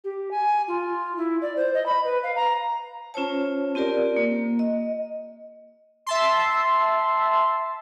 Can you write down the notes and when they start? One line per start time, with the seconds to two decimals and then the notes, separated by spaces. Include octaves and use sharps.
0.04 G4
0.31 G#5
0.68 F4
1.17 E4
1.42 D5
1.57 C5
1.74 D#5
1.86 B5
2.05 B4
2.24 F5
2.36 A#5
3.14 C#4 F4 C5 C#5 A5
3.75 C4 F4 G4 A#4 D5
4.16 A#3
4.59 D#5
6.06 E5 A5 C6